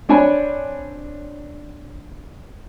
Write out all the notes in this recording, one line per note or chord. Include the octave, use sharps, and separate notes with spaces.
C4 D4 C#5 G#5 B5